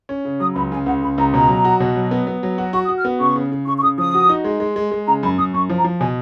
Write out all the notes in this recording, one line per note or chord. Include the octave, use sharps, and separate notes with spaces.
C#4
C#3
F#3 D#6
C#2 B5
C#3 G#5
C#2 F#5
C#3 B5
C#2 A#5
B2 A#5
F#3
F#4
B2
F#3
B3
B3
F#3
F#4
F#4 C#6
D#6
F#4
F6
B3
C#3 C#6
C#3
C#3
C#3 C#6
C#6
C#3 D#6
F3 D#6
F#4
D#4
G#3
G#3
G#3
G#3
C#3 A#5
F#2 B5
F#2 D#6
F#2 C#6
F3
A#5
F3
B2 G#5